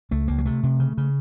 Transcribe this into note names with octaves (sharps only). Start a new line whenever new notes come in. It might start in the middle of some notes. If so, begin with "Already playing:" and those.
C#2 A3
C#2 A#3
F#3
C3 A3
C3
C#3
C#3